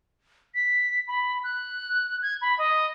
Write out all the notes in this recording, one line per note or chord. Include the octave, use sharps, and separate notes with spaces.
B6
B5
F#6
G#6
B5
D#5